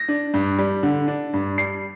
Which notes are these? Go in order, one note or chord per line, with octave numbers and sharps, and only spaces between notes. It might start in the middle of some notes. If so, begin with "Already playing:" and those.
Already playing: A#6
D4
G2
G3
D3
D4
G2
G3 C7